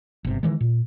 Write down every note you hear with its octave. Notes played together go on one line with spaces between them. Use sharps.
G1 C3
D#3 E3 G#3
A#2